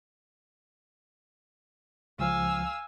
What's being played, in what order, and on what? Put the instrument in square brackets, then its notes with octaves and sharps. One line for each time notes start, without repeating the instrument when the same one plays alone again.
[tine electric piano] C#2 F3 [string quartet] F5 G#5 E6